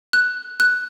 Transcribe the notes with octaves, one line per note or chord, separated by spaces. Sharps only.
F#6
F#6